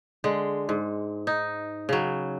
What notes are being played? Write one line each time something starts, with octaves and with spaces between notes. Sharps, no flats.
D3 G#3
G#2
D#4
C#3 F#3